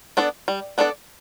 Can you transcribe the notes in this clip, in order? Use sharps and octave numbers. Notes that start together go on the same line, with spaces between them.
B3 D4 A4 D5
G3
B3 D4 A4 D5